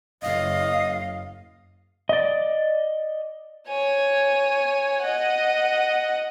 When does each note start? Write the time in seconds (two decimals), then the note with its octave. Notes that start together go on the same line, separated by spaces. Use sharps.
0.22 F#1 D#5 F5
2.09 D5 D#5
3.68 C#5 G#5
5.03 D#5 F#5